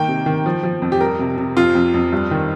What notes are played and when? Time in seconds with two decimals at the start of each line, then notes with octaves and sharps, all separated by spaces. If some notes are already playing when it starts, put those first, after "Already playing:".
Already playing: D#3 A#3 G5
0.08 C3
0.26 D#3
0.46 F3
0.63 F3
0.82 F2
0.92 G4
1.00 G3 A#4
1.19 C3
1.37 C3
1.56 F2 F4
1.75 F2
1.94 F2
2.13 G2
2.31 D#3